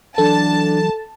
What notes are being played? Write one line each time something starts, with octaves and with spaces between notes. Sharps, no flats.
E3 F#3 D4 A4 A5